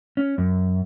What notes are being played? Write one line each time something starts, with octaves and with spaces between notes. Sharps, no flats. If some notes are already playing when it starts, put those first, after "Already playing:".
C#4
F#2